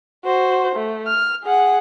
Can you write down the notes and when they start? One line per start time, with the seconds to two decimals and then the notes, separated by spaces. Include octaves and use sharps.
0.24 F#4 C5
0.76 A3
1.07 F6
1.44 G#4 F#5